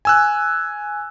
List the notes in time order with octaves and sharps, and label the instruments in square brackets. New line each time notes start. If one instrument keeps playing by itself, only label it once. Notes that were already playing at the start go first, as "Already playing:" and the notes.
[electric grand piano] G#5 E6 F#6